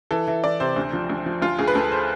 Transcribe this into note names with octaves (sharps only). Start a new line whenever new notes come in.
E3 A4
E3
E3 D5
C3 C5
D2
F3
D2
F3
D2 F4
D2 G#4
B4
D2 A4
C5